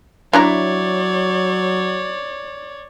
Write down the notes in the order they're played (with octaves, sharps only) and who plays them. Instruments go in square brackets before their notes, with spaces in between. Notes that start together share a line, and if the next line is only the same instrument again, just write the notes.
[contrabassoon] F#3 [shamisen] D4 E4 A#5 [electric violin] C#5 D5